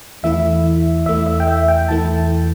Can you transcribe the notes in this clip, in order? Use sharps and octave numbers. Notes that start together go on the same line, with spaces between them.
E2 E3 A3 E4 E5
E2 E3 A3 E4 E5
E5
G5
E5
G5
E2 E3 A3 E4 A5